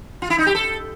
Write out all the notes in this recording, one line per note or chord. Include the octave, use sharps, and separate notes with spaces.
F4
E4
D#4
G4
A4